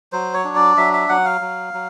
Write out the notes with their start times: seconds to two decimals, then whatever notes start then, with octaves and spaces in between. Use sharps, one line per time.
0.12 F#3 C5
0.34 C#5
0.45 D4
0.56 D5
0.77 F#3 E5
0.93 E5
1.09 F#3 F#5
1.25 F5
1.41 F#3
1.74 F#3